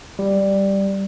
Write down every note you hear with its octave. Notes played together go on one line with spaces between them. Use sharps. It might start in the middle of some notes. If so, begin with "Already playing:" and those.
G3